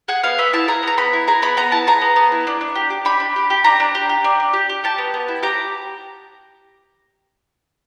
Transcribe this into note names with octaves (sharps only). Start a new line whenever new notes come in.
G#4 F#5
B3 F5
B3 E5
E4 A5
G#4 A#5
B3 A#5
B3 B5
E4
G#4 A#5
B3 B5
B3 A#5
E4 A5
G#4 A#5
B3
B3
E4
D4
D4
G4
G4
D4 B5
D4
G4
G4
D4 A#5
D4
G4
G4
D4
D4
G4
G4
G4 A5
B3
B3
E4
G4 A#5